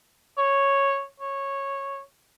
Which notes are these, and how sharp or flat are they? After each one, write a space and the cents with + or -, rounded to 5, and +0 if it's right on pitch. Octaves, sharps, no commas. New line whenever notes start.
C#5 -5
C#5 -10